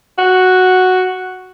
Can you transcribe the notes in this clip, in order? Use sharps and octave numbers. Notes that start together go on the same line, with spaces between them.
F#4